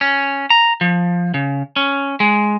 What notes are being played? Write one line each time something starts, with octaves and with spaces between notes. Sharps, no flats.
C#4
A#5
F3
C#3
C#4
G#3